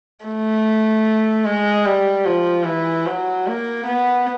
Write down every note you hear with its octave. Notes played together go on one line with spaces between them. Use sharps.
A3
G#3
G3
F3
E3
F#3
A#3
B3